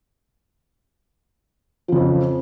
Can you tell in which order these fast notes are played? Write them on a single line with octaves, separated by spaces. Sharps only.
F3 C#3 F2